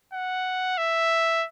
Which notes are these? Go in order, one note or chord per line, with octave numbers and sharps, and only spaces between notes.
F#5
E5